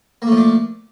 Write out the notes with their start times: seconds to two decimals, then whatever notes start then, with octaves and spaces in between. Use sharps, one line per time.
0.22 A#3
0.27 A3
0.32 F3
0.37 D4